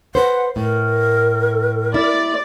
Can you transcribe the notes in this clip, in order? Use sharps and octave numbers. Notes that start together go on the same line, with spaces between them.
B4 C5 F#5
A2 A#4
E4 D5